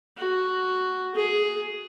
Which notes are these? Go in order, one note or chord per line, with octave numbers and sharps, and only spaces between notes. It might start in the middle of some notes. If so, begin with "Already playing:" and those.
F#4
G#4